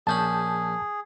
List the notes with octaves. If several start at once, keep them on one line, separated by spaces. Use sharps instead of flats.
A#1 C#4 G#4 A5 B5 G6